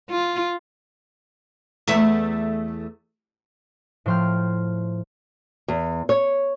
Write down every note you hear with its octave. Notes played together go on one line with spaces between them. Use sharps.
F4
E2 A3 E5
A2 F3 C5 G5 F6
E2
C#5